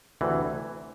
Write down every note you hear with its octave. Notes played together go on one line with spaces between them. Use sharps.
D2 C3 E3